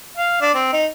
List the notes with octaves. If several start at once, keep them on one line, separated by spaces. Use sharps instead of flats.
F5
D4
C4
D#4